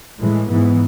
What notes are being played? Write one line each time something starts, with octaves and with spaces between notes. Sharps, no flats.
A2 E3 G#3
G#2 E3 B3